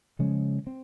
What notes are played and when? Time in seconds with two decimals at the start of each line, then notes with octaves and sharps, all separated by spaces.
0.19 C#3 F3 G#3 C#4
0.67 C4